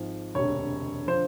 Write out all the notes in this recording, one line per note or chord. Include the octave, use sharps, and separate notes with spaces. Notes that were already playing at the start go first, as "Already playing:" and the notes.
Already playing: G#1 G#2 F3
E1 D2 C3 C#5
D3 F3 C5